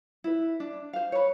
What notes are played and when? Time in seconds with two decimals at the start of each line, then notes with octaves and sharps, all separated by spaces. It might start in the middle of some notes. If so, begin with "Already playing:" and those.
0.24 E4 B4
0.60 D4
0.93 C5 F5
1.12 B4 C#5